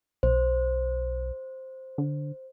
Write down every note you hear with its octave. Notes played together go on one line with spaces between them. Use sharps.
B1 C5
D3